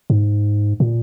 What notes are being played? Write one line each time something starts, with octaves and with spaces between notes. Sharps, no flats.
G#2
A#2